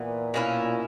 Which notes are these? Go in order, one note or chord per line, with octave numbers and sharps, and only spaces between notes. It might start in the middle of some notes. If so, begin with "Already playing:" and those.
Already playing: A#2 E3 B3
B2 A#3 C#4 E4